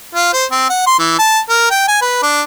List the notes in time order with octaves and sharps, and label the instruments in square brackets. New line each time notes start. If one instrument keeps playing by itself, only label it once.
[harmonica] F4
C5
C4
F#5
C6
E3
A5
A#4
G5
G#5
B4
D4